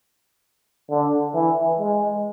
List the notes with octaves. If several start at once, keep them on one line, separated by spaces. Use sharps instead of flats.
D3
E3
G#3